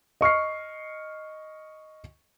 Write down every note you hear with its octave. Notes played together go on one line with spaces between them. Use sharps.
D#5 C#6 F6 C7